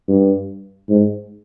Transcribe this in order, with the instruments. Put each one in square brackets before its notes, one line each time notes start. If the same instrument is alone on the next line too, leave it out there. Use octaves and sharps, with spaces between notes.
[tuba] G2
G#2